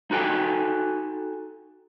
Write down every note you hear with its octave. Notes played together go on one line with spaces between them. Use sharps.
D#4 F#4 A4 G5 G#5